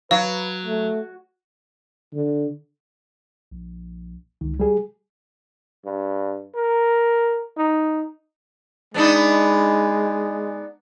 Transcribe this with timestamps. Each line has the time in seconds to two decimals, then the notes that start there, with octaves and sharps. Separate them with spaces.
0.11 F#3 B4 F5
0.65 A3
2.13 D3
3.51 A#1
4.41 C#2 D#3
4.60 G3 G#4
5.85 G2
6.55 A#4
7.57 D#4
8.94 G#3 B3 D4 D#4